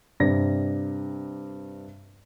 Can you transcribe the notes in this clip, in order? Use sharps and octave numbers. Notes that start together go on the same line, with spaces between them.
G2 C3 D5 A#6